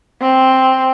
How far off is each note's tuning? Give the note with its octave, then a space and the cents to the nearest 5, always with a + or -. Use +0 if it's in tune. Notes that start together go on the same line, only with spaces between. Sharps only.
C4 +0